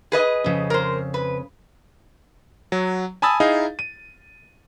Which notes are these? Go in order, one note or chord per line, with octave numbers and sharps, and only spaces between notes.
G#4 B4 D#5
F2 C#3
A#4 C5
B4
F#3
G#5 A5 B5 D#6 E6 A6
D#4 E4 G#4 D#5 F5
D#7